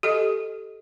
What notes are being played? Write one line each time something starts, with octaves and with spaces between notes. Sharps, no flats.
G4 A4 D#5